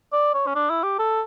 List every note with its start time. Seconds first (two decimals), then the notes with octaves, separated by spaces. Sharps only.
0.12 D5
0.34 C#5
0.47 C#4
0.55 D4
0.70 E4
0.83 G4
0.99 A4